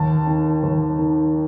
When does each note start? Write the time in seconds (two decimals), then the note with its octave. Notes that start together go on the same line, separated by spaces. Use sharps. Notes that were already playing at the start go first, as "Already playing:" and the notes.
Already playing: D#2 A5
0.27 D#3
0.63 D#2
0.99 D#3